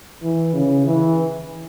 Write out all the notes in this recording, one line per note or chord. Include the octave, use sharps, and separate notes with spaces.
E3
C#3
E3